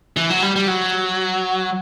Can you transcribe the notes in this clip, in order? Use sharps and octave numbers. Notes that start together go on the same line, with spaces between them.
E3
F#3
G3
G3
F#3